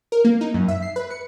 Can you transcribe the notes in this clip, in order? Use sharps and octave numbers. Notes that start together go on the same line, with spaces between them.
A#4
A#3
D#4
F#2
E5
C7
B4
C#7